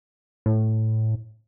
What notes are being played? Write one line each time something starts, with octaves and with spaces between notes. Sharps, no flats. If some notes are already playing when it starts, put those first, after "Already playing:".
A2